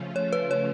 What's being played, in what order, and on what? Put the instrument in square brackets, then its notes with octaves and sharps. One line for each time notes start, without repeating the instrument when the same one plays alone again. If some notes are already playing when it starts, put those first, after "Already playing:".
Already playing: [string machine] C#3 F3 A3 C#4 F4
[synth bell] C#5
B4
C#5